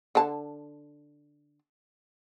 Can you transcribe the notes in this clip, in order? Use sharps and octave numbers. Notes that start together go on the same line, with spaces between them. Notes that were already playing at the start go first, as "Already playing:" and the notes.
D3 A5